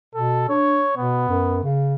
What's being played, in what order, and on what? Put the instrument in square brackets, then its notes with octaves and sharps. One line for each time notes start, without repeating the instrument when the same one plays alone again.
[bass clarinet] B2 [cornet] A4
[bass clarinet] D4 [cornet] C#5
[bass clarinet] B2 [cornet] B3
[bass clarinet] F#2
C#3